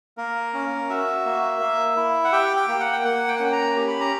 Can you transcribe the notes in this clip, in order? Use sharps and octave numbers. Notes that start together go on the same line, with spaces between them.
A#3 A#4
C#4
F#4 E5
A#3
A#3
E4
F#5
G4 G5
G5
A#3
F#5
G5
A#3 F#5
G5
F#5
C#4 G5
A#5
G4
B5
A#5